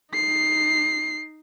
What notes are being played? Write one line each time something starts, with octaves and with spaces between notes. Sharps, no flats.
D#4 C7